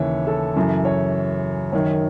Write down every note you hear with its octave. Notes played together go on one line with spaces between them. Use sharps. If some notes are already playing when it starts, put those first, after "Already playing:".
Already playing: D#2 C#3 E3 C#5 E5
A4
F#2 C#3 E3
C#5
F#2 D#3 C#5